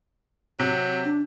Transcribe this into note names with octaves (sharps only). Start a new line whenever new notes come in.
C3 F#3
D4